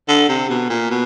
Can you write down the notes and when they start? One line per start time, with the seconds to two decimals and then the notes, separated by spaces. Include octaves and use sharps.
0.08 D3
0.28 C3
0.49 B2
0.70 A#2
0.90 B2